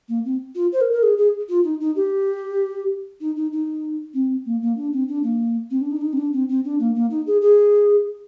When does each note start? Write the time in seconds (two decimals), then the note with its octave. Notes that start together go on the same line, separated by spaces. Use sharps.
0.09 A#3
0.25 C4
0.55 F4
0.72 C5
0.81 A#4
0.92 A#4
1.03 G#4
1.18 G#4
1.49 F4
1.64 D#4
1.81 D#4
1.96 G4
3.21 D#4
3.37 D#4
3.52 D#4
4.14 C4
4.45 A#3
4.62 A#3
4.77 D4
4.93 C4
5.08 D4
5.23 A#3
5.71 C4
5.81 D4
5.91 D#4
5.96 D4
6.01 D#4
6.13 C4
6.17 D4
6.33 C4
6.49 C4
6.65 D4
6.80 A#3
6.95 A#3
7.10 D#4
7.27 G#4
7.41 G#4